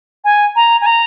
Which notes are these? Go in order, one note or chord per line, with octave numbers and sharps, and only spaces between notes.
G#5
A#5
G#5
A#5